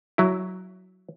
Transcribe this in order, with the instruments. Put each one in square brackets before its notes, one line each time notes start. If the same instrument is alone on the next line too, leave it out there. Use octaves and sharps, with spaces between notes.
[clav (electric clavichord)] F#3 E4